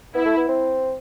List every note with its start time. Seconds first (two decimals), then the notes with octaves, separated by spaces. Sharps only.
0.15 B3 E4
0.26 A3
0.37 B3
0.48 C4